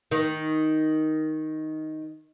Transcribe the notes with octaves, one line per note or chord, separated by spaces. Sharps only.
D#3